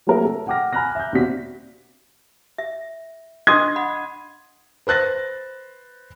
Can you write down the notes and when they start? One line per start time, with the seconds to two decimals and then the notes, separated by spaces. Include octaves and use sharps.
0.07 F#3 A3 A#3 G#4 A#4 E5
0.25 A4
0.47 F#5 G5 D6 F6 A#6
0.73 G#5 A#5 B5 F6 F#6 A#6
0.95 E5 G6
1.13 D#2 B2 C4 D4 F#4 B6
2.58 E5
3.47 D4 D#5 C6 D6 D#6 G#6
3.76 F#5 B5
4.87 B4 C5 F#6 A6 A#6